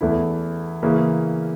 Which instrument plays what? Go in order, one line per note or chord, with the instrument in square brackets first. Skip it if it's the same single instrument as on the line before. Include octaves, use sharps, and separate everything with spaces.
[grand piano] E2 E3 A3 E4
C#3 E3 A#3 C#4